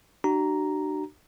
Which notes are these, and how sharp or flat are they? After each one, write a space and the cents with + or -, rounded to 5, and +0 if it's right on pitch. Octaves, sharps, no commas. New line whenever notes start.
D4 +40 F#4 +40 A#5 +0